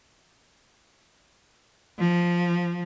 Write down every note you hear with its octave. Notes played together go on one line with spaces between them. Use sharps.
F3